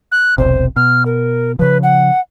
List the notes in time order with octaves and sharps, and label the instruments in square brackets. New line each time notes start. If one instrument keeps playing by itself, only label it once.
[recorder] F#6
[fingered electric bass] E1 B1 C3 [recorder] C5
[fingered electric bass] B2 [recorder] F6
[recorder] A#4
[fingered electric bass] C#3 F3 [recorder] B4
[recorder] F#5